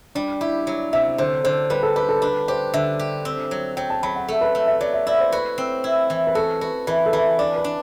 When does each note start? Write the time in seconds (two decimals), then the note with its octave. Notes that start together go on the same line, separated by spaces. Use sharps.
0.15 G3 D4
0.41 E4 G4
0.67 F#3
0.93 C3 E5
1.18 D3 C5
1.44 D3 C5
1.70 G3 B4
1.83 A4
1.96 G4 B4
2.09 A4
2.22 D4 B4
2.48 G4 C5
2.74 D3 E5
2.99 G4
3.25 C4
3.51 F#3
3.77 F#3 G5
3.90 A5
4.03 F#3 B5
4.15 F#5
4.28 A3 A4
4.41 B4
4.55 A3
4.67 E5
4.81 F#3 D5
4.94 E5
5.07 E4 D5
5.19 C5
5.32 F#4 B4
5.58 C4
5.84 E4
6.10 E3
6.27 B4
6.35 F#4 A4
6.61 F#4 B4
6.87 E3 B4
7.06 A4
7.13 E3 B4
7.39 D4 D5
7.56 B4
7.64 D4